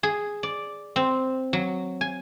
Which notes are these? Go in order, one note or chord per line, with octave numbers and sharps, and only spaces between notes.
G#4
D5
C4
F#3
G#5